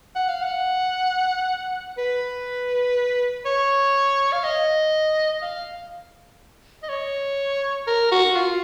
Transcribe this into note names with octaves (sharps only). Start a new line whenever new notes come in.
F#5
F5
F#5
B4
C#5
F5
D#5
F5
D#5
C#5
A#4
F#4
F4